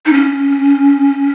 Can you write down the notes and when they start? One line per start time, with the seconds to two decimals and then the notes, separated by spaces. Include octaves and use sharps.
0.06 D#4
0.13 C#4